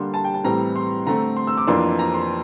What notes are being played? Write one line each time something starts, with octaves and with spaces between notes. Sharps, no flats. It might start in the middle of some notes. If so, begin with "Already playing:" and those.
Already playing: D3 G3 A#3 D4 C6
A5
G5
A5
A2 E3 G3 C4 A#5
C6
D3 A3 C4 A#5
C6
E6
D6
F2 E3 A#3 D4 C6
A#5
C6